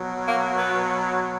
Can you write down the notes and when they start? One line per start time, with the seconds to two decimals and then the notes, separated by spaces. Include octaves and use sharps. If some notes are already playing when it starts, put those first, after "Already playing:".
Already playing: B2 F#3
0.25 A#3
0.56 B3